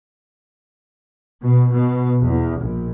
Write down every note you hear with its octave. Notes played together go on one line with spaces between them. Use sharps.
B2
B2
E2
A#1